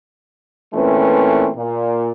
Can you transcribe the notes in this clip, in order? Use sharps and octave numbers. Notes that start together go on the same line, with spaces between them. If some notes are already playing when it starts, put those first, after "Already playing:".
A#2 E3 A3 C4 C#4 B4
A#2